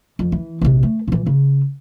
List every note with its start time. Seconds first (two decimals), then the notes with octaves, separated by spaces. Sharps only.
0.19 F2
0.32 E3
0.61 A#1 C3
0.83 A3
1.08 A#2 E3
1.26 C#3